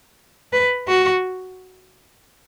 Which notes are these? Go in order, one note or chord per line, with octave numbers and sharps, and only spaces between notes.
B4
F#4